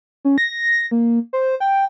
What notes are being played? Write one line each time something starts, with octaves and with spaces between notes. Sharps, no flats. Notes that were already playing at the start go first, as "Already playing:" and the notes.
C#4
A#6
A#3
C5
G5